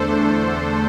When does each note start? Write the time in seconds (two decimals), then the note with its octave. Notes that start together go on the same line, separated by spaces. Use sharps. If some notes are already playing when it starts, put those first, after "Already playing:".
Already playing: E2 D3 A3 D4 A4 C5